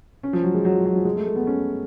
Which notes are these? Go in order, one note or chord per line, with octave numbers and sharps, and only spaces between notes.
C#4
F3
F#3
G#3
F#3
F3
F#3
F3
G#3
A3
A3
B3
C#4